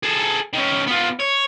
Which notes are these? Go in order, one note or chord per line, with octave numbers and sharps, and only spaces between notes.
G#4 A4
D#3 C#4
B3 F4
C#5